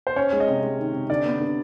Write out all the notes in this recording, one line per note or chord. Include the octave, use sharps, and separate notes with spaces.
C5
C#4 C#5
G#3
D#5
C3
G#3
D#3
C3
D3 D5
B3
D3